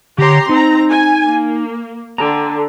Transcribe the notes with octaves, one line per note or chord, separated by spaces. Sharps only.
D3 G4 C#5 A#5 C6
C4 D#4 A#5
G#5
A#3
D3 G5 A5 A#5